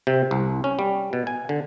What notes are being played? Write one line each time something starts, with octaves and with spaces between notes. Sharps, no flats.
C3
C2
C#4
G3
B2
G#5
D3